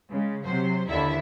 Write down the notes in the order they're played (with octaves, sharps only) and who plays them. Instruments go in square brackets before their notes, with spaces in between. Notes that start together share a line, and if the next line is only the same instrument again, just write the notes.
[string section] C#3 G#3
C3 F#3 C5
D#2 D3 D#3 E4 E5